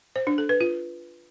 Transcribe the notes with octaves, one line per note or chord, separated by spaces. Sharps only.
C5
D4
A4
B4
F4